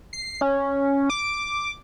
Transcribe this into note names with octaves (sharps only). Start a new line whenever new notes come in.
C7
C#4
D6